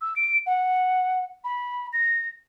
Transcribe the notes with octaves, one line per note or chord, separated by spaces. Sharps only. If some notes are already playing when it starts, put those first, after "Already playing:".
E6
D7
F#5
B5
A#6